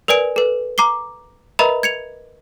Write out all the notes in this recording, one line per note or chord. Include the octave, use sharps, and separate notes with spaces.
A#4 B4 D5 G#5 D7
A4 B4
A#5 D6 C7 G7
A#4 B4 D#5 E5 A#5 B5
G#6 C#7 F7